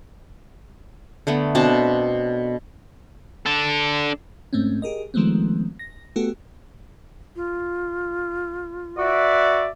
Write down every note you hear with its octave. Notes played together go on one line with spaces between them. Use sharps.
D3 A3 B3
B2 C4 D4 A5
D4 A4
G#2 A3 C4 C#4
G4 G#4 A#4 D#5
D#3 F3 G#3 A3 B3 C4
A#6
A3 B3 F#4 G4 A4
F4
F#4 B4 D5 E5